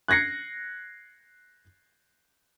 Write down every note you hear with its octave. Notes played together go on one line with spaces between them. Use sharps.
F#6 G#6 A#6 C7 C#7